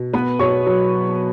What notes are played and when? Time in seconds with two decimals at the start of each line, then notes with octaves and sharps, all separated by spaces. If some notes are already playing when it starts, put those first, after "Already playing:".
Already playing: B2
0.13 B3 B4 B5
0.39 B2 C#5 C#6
0.67 F#3